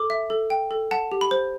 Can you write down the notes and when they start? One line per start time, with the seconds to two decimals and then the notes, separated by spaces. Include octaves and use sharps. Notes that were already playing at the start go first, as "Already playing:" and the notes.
Already playing: A4 D6
0.10 E5
0.30 A4
0.50 G5
0.71 A4
0.91 F#5 A5
1.12 G4
1.21 B5
1.31 C5